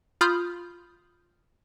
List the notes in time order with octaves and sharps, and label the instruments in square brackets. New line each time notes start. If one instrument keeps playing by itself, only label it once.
[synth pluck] F4 B5 D#6 F6 G6